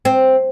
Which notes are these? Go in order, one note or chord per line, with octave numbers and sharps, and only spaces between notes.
C4